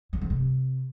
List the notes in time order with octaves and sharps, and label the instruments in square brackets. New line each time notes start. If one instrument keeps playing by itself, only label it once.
[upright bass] D3
F2
C3